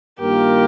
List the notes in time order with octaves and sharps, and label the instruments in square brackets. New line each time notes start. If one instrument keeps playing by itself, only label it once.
[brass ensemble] G2 D#3 A#3 F4 A#4 [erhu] G4